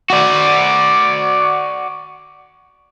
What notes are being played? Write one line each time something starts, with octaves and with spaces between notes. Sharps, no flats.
F#4 D5